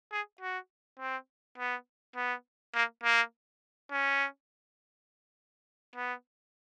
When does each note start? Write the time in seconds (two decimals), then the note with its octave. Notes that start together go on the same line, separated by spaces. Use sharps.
0.12 G#4
0.41 F#4
0.99 C4
1.58 B3
2.16 B3
2.75 A#3
3.04 A#3
3.91 C#4
5.96 B3